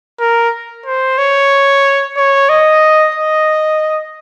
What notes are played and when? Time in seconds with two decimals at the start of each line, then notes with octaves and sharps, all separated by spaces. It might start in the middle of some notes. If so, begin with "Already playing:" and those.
0.20 A#4
0.86 C5
1.18 C#5
2.17 C#5
2.49 D#5
3.15 D#5